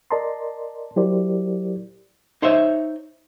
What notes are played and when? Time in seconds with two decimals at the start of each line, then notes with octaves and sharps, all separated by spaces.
0.11 A#4 D5 D#5 A5 A#5 C6
0.96 F#3 E4 G4 A#4 C5 D5
2.42 D#4 C5 C#5 E5